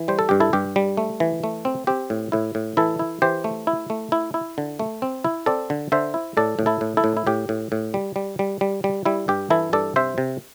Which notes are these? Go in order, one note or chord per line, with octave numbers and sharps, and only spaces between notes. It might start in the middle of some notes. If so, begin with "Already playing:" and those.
Already playing: E3
G3 C5
A4
G2 G4
E4 A4
G2 G4
G3
A3
E3
A3
C4
C4 G4
A2
A2 E4
A2
E3 E4 A4
E4
E3 G4 C5
A3
E4
A3
E4
E4
D3
A3
C4
E4
C4 A4 D5
D3
D3 C5 E5
E4
A2 A4 D5
A2
E4 A4
A2
E4 A4
A2
E4
A2 G4
A2
A2
G3
G3
G3
G3
G3
G3 E4
G2 G4
E3 E4 A4
G2 A4 D5
C3 C5 E5
C3